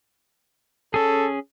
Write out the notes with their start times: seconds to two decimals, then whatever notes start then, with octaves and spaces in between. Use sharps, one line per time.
0.94 C#4 G#4 A4